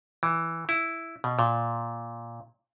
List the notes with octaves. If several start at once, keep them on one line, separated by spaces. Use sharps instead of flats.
E3
E4
B2
A#2